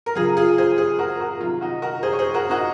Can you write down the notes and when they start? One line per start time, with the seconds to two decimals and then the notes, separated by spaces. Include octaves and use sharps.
0.06 A#4
0.15 C#3 F#3 F4 G#4
0.37 F4 G#4
0.58 G#4 C5
0.78 G#4 C5
0.99 F#4 A#4
1.20 F#4 A#4
1.40 C3 D#3 F#3 F4
1.61 D#4 F#4
1.82 F#4 A#4
2.03 G#4 C5
2.12 C#5
2.19 G#4 C5
2.34 F#4 A#4
2.50 D#4 F#4